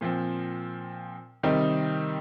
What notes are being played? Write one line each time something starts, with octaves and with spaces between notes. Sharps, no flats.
A#2 F3 C4
C3 D#3 G3 C4 D#4